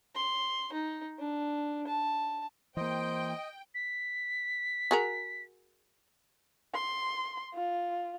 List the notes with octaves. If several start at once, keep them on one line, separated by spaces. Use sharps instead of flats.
C6
D#4
D4
A5
E3 A#3 C5 D#5 G5
B6
F#4 G#4 A#4
C6
F4